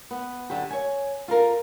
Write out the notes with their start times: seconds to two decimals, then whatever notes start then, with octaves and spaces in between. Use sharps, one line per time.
0.11 B3
0.50 D3 F#3 G4
0.71 C#5 G#5
1.28 F4 A4 A#4